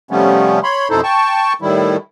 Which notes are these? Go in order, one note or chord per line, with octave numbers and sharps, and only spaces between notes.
C3 F3 G3 A3 B3 C#4
C#5 B5 C6
F2 B2 D#4 E4 A4 C5
G5 A5 C#6
A2 D#3 G3 E4